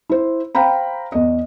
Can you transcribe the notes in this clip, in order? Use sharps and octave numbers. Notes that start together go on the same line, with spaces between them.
E4 C5
C5 F5 G5 A#5 B5
E2 D#5